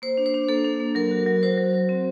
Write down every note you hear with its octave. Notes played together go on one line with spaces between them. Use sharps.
A#3 C5
D4
C5
D4
A#3 A4
D4
A#3
F#3 A#4
F#4
F#3
F#4 C5
F#3
F#4
C4